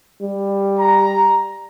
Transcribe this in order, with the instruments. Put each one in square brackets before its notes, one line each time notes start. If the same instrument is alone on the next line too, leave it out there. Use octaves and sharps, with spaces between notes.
[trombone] G3
[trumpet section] A#5